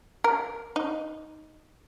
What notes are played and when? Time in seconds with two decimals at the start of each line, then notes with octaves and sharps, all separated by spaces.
0.24 A#4
0.76 D#4